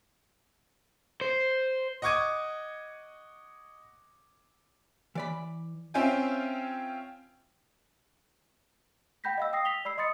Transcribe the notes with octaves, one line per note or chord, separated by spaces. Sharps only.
C5
D#5 F#5 C#6 D6 G#6 D#7
E3 D5 B5
C4 C#4 F4 E5 G5 G#5
F#5 G5 B5 G6 A#6 B6
D#5 F5 E6
G5 D#6 E6 A#6 C7
B6 F7 G7
D5 B5 E6 C7
D#5 C6 D#6 A6 C#7